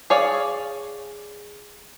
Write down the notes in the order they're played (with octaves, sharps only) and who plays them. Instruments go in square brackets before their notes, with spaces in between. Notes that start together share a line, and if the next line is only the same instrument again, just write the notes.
[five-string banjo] G#4 C#5 D5 F5